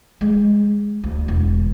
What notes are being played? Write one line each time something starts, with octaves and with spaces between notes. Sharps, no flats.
G#3
D2
E1